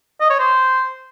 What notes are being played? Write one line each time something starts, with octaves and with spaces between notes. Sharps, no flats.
D#5
C#5
C5